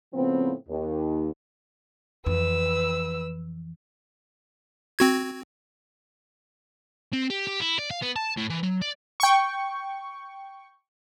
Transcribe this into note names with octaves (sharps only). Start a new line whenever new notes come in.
A2 C#3 F3 B3 C4
D#2
F2 E3 B4 E6
C4 F#4 G#6
C4
G4
G4
E4
D5
F5
B3
A5
A2
E3
F#3
D5
G5 C#6